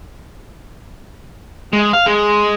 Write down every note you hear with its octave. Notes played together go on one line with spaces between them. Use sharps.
G#3
F5
G#3